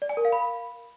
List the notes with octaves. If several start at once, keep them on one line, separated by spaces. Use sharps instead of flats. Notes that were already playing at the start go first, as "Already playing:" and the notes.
D5
G#5
A#4
F5
B5